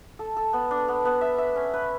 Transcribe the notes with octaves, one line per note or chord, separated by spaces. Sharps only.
A4
A4
B3
D4
B3
B3
E5
E5
C#4
B4